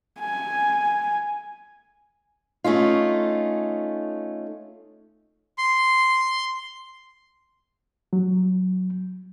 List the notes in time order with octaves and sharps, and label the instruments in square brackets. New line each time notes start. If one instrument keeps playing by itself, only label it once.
[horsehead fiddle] G#5
[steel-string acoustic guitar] A3 C#4 D#4 F4
[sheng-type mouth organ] C6
[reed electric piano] F#3